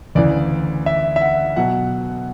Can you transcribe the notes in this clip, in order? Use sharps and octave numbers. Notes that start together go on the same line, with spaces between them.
D2 C#3 E3 D5
E5
E5
F#5
B2 F#3 F#5